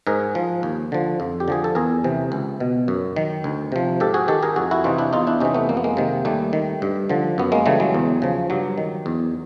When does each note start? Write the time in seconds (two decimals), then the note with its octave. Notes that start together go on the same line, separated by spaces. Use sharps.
0.07 G#2 G#4 A#4
0.35 F3
0.63 D#2
0.92 D3 F3
1.20 F2
1.40 G4
1.48 D3 F3 G#4
1.64 A4
1.75 E2 G#4 A#4
2.04 C3 E3
2.32 C#2
2.60 B2
2.88 F#2
3.16 D#3
3.44 D2
3.72 C3 F3
4.00 G#2 G4 A4
4.14 F#4 G#4
4.28 D#3 G4 A4
4.43 G#4 A#4
4.56 F2 F#4 G#4
4.71 E4 F#4
4.84 C3 E3 D#4 F4
4.98 D4 E4
5.13 E2 D#4 F4
5.27 D4 E4
5.40 C3 E3 C#4 D#4
5.54 A3 B3
5.69 F2 A#3
5.77 B3
5.84 G#3 A#3
5.97 C3 D#3
6.25 D#2 G3 A3
6.53 D#3
6.82 G2
7.09 D3 F3
7.38 F#2 B3
7.52 G#3 A#3
7.66 C#3 E3 G3 A3
7.80 F#3 G#3
7.94 E2
8.22 C#3 F3
8.50 G2 F#3
8.78 D#3
9.06 E2